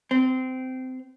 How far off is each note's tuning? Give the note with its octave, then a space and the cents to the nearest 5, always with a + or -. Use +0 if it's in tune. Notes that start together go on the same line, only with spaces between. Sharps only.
C4 -20